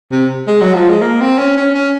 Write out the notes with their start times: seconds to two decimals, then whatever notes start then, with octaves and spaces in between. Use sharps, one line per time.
0.11 C3
0.47 G#3
0.61 F#3
0.74 F3
0.89 G#3
1.02 A#3
1.21 C4
1.38 C#4
1.57 C#4
1.74 C#4